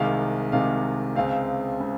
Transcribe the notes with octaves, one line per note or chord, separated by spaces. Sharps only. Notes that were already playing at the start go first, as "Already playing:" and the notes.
Already playing: C2 C3 D#3 G#3 F5
C2 C3 D#3 G#3 F5
C#2 C#3 G#3 C4 F5
C#3 G#3 C4